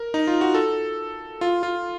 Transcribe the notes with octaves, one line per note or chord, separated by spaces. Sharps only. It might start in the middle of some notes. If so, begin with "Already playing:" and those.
Already playing: A#4
D#4
F4
F#4
A4
F4
F4